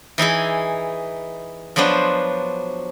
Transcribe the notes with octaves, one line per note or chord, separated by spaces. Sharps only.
E3 D#4 E4 G#4
F3 F#3 B3 D4 C5